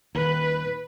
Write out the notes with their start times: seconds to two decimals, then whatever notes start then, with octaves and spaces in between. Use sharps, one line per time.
0.15 D#1 D#2 B4